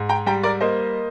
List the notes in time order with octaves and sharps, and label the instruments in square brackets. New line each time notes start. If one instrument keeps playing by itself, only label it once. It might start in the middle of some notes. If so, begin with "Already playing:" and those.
Already playing: [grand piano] G#2
G5 A#5
G3 G5 A#5
A#4 D5
A#3 C5 D#5